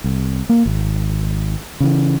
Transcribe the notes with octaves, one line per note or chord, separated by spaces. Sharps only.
C2
A#3
G#1
C#3 E3